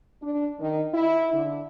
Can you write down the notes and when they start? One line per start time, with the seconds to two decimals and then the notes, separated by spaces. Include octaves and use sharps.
0.21 D4
0.59 D#3
0.93 E4
1.32 D3